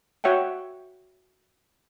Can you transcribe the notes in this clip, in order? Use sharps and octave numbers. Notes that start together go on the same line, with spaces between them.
F#4 C#5 E5 F#5 G5